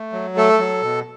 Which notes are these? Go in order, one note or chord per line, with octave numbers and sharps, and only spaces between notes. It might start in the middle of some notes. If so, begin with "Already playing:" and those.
Already playing: A3
F#3
A3 A4
F#3
B2